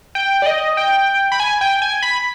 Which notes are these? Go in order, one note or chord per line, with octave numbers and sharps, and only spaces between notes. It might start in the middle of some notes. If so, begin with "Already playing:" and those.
G5
D5
D#5
G5
B5
G#5
G5
G#5
B5